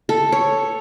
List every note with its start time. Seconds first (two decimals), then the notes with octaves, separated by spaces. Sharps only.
0.09 A4
0.32 C#5